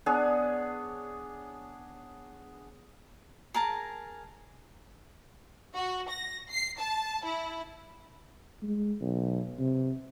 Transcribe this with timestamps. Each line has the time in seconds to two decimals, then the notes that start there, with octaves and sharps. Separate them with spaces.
0.06 B3 D4 G#4 C#5
3.54 G#4 A#4 A5 A#5
5.76 F#4
6.09 A#6
6.50 C7
6.79 A5
7.25 E4
8.62 G#3
9.01 B1
9.59 C3